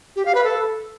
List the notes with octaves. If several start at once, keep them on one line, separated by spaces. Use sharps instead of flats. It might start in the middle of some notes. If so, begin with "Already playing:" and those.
G4
F5
B4
A4